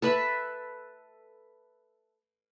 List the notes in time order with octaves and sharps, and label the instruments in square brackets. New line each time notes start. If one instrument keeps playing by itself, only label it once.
[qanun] A4 B4 E5 B5